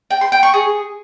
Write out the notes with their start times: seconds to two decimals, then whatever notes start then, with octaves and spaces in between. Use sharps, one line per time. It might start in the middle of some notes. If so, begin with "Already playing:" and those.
0.11 G5
0.21 C6
0.32 G5
0.43 C#6
0.54 G#4